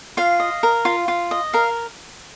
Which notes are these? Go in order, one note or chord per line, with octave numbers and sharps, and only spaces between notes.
F4 F5
D#5
A#4
F4
F4
D#5
A#4 F5